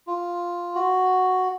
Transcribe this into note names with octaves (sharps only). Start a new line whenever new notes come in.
F4
F#4